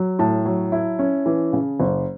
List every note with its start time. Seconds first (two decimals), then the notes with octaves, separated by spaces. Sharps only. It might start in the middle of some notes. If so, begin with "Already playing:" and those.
Already playing: F#3
0.19 A2 A5
0.45 F#3
0.72 E4
0.99 C#4
1.26 E3
1.53 C#3
1.80 F#1